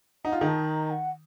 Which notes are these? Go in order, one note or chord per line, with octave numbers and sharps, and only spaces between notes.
D#4 F#5
F4
D#3 D#4
A5
A#5
F#5